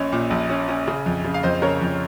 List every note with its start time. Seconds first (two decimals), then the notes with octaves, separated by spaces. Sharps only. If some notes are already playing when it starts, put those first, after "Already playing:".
Already playing: A#1 C#4 D#5
0.12 A#2
0.30 A#1
0.49 C#4
0.69 C#4
0.88 C#3
1.06 F2
1.25 C#3
1.34 F5
1.43 F2 C5 D#5
1.62 C#3 A#4 C#5
1.81 F2